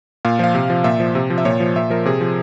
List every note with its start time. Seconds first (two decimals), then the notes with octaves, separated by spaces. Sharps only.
0.25 A#2 F5
0.39 F3 F5
0.55 C3
0.70 F3
0.84 A#2 E5
1.00 F3
1.15 C3
1.30 F3
1.38 E5
1.45 A#2 C#5
1.60 F3
1.76 A#2 E5
1.90 F3 A#4
2.05 C3 G#4
2.21 F3